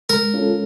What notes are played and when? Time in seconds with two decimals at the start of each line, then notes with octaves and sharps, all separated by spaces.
0.10 G#3 A#4
0.34 C#4 F4 A4